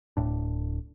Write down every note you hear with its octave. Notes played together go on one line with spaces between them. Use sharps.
D1 A2 D4